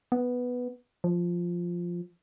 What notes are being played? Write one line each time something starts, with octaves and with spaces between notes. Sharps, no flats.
B3
F3